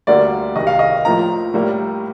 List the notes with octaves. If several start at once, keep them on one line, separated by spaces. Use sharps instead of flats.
D2 D3 G3 A#3 D5
C2 C3 D#3 D#5
F5
D#5
A2 F3 A#3 A#5
A2 G3 A#3